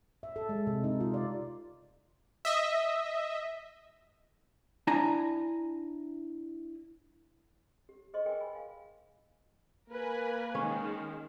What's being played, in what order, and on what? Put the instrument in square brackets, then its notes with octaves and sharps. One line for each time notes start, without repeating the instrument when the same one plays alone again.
[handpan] E5
A4
G#3
C3
D#4
F4
D5
[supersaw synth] D#5 E5
[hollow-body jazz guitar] D4 E4 D5 G#5 A#5
[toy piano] G4
G#4 C5 D#5 C6 C#6
G#4 A#4 B4 D#5 G5 G#5
G#5 B5
F5 G#5
[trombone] A#3 [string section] A#4 B4 G#5
[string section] D#3 G#3 [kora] C#4